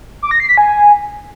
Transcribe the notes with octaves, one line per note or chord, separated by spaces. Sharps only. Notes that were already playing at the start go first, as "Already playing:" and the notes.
D6
A#6
C7
B6
G#5